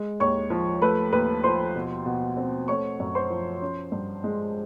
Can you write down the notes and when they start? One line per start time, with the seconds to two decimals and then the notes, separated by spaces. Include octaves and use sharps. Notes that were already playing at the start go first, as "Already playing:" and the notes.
Already playing: G#3
0.20 D#2 C#5 C#6
0.50 F3
0.82 A3 B4 B5
1.12 D#2 B4 B5
1.44 F3 C5 C6
1.76 B2
2.06 B2
2.37 C4
2.68 A3 C#5 C#6
3.00 F#2
3.15 C5 C6
3.30 F3
3.62 C#4
3.92 G2
4.24 G#3